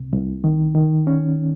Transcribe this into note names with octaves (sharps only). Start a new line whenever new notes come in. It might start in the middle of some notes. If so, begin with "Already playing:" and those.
Already playing: C2 C3
C2
D#3
D#3
C#4